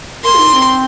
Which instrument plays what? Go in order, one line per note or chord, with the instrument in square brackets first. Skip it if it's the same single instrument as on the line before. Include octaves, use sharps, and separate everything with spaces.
[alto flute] A#4 [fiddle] C6
[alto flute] F4
D#4
C4